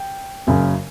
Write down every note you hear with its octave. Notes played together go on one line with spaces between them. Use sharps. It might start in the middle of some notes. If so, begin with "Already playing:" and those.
Already playing: G5
F#1 F#2 C#3